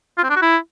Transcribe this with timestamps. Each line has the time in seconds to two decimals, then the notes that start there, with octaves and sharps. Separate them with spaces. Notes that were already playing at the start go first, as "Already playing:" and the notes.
0.18 F4
0.24 C4
0.30 D4
0.36 F#4
0.42 E4